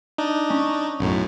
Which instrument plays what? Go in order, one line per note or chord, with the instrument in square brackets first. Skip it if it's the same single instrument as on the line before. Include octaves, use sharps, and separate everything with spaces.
[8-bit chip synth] D4 D#4
[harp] C#4
[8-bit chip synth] B1 F#2 A2